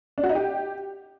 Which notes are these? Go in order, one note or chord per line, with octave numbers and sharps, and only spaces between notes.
D4
F#4
D#4
G4